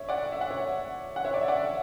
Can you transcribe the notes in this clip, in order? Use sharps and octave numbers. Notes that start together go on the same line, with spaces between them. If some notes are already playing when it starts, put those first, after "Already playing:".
Already playing: C#5 E5
D5 F#5
E5
F#5
C#5 E5
F#5
C#5 E5
D5
E5
D5 F#5